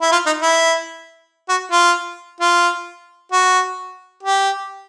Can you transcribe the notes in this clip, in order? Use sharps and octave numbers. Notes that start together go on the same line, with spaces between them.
E4
F4
D#4
E4
F#4
F4
F4
F#4
G4